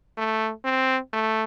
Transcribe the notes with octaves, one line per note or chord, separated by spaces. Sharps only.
A3
C4
A3